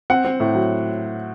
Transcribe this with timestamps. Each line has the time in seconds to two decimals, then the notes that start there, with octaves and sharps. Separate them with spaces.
0.10 C4 F#5
0.25 C4
0.40 A2
0.55 F#3